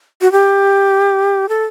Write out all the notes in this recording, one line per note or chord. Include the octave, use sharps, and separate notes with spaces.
F#4
G4
A4